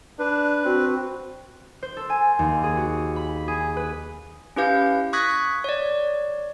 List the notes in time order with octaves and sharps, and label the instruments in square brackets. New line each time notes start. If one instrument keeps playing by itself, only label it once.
[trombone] D4 [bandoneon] B4
[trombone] C4 [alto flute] F#4
[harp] C5
A4
G#5
D#2
G#4
F#4
B5
G#4
B4
[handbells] C#4 E4 G4 B4 F5 G6
C#6 D#6 F#6 G#6 A#6 B6
C#5 D5